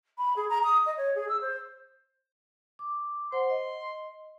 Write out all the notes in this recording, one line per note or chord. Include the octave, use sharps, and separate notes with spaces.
B5
G#4
A#5
D#6
D#5
C#5
G#4
E6
C5
D6
C5 F#5 C6
D#5